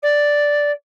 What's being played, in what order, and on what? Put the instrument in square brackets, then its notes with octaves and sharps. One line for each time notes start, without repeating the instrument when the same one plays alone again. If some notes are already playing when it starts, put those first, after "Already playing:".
[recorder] D5